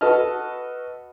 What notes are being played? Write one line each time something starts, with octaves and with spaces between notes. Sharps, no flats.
F#4 A4 B4 D#5 A5 F6